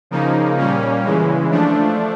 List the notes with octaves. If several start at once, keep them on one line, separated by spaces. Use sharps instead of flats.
C#3 F3 A#3 D#4
A#2 G3 A#3 C#4
C#3 E3 G#3
F3 A3 D4